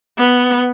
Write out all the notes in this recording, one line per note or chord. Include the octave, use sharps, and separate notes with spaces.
B3